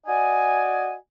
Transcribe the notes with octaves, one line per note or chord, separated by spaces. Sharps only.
F#4 D5 D#5 G#5